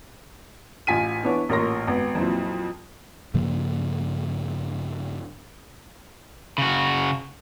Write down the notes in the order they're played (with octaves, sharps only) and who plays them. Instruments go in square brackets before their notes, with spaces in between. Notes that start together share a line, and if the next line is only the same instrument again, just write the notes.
[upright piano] A1 F4 G#5 B6 D#7
E3 B3 D4 C#5
A1 A#2 A#4 C#5 C6 A#6
G#1 B3
F2 A#2 E3 F#3 C4
[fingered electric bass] G2 C#3 F3 A#3
[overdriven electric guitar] C#3 F#4